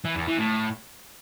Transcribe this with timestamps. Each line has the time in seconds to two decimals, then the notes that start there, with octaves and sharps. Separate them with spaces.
0.05 E3
0.16 E2
0.27 E3
0.39 A2